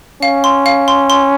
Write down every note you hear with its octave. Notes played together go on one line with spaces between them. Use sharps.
C#4 F5
C6
F5
C6
C6